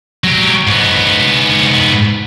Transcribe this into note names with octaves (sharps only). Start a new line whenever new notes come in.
F#3 G4
G#2 B3